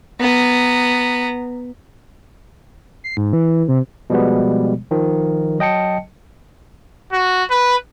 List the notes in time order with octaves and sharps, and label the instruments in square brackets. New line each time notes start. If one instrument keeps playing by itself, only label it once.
[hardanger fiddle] B3 A#5
[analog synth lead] C7
G#2
E3
C3
[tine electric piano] B2 F3 G3 G#3 B3
D#3 F3
F#3 D#5 G5 A5 C#7
[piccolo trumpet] F#4
B4